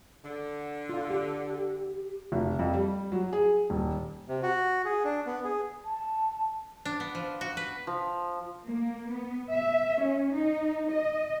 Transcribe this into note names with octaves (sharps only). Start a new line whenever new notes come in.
D3
F4 F5
G4
F1
F2
G3
F#3
G#4
D#1
C3
F#4
G#4
D4
B3
G#4
A5
D4
B3
F3
F#4
B4
F3
A#3
B3
E5
C#4
D#4
D#5